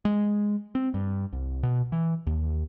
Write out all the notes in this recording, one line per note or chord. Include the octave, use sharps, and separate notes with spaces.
G#3
C4
G2
C2
B2
E3
D#2